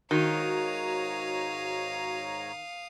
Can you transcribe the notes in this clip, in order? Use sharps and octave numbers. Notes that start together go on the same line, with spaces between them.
G#2 D#3 F#4 C#5 F5 A#5 D#6